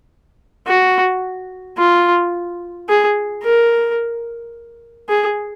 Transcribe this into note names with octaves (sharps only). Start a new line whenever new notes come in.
F#4
F4
G#4
A#4
G#4